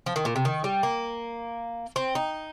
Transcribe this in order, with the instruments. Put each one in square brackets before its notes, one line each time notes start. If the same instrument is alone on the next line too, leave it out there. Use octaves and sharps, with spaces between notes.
[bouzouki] F3
D#3
A#2
C3
D#3
G3
A#3
C4
D#4